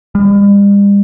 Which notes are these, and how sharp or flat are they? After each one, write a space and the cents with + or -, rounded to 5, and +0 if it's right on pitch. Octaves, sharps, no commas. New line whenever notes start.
G3 +45